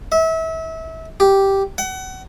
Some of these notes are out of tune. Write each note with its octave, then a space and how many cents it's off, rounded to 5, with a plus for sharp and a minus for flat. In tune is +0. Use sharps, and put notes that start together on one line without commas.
E5 -30
G4 -5
F#5 +30